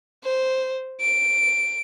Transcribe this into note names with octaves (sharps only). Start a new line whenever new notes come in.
C5
D7